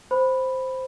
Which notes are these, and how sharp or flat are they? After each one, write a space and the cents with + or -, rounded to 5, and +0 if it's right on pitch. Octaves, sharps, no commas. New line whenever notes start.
C5 +0 B5 +0